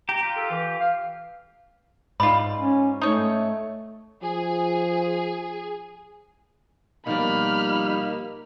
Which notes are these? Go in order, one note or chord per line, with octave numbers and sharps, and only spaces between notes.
G4 A#5
F4 G4
A4
E3
F5
G#2 F4 D5 B5
C#4
A3 D#4 C#5
F3 G#4
B2 F3 G3 A#3 D#4 B5 F6